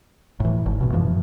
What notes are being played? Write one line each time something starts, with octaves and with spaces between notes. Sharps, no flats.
A2 E3
G#1
A1 B2
F#2 E3 F3